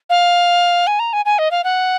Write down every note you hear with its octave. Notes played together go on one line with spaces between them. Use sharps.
F5
G#5
A#5
G#5
G#5
D#5
F5
F#5